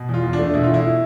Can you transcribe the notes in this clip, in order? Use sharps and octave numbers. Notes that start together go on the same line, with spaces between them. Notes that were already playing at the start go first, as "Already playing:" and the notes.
Already playing: B2
E2
F4
E2
D4
A3
B2 E4
F4
E2
E4